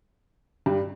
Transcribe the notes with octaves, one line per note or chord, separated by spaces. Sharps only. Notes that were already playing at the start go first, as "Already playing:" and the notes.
G2 G3